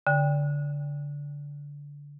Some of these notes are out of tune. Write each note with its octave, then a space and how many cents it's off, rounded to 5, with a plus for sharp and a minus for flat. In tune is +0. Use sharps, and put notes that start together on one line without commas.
D3 -20 G5 +20